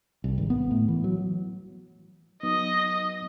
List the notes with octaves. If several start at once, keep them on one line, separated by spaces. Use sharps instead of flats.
C2
G#1
B3
A2
E3
F#3
F#3 B3 D#4 D#5 D#6